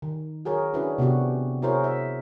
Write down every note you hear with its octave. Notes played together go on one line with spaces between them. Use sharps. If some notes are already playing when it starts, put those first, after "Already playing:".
D#3
F#4 G#4 A#4 C#5
C#4 D4 E4 F#4 G#4 B4
C3 B3 C4 D4 F#4 G4
E4 F#4 G#4 A#4 C5 C#5
E5